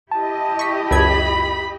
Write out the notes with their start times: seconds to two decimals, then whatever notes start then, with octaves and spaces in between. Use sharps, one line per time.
0.11 E4 G4 D#5 A5
0.59 C#6 B6
0.91 C#2 F#2 B5 G#6